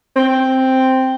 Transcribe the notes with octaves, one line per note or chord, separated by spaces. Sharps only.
C4